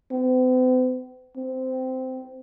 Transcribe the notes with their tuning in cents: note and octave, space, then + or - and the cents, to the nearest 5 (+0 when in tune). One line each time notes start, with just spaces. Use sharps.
C4 -45
C4 -15